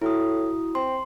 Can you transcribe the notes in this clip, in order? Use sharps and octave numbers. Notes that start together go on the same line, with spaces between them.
A2 E4 F#4 D#6
C4 C6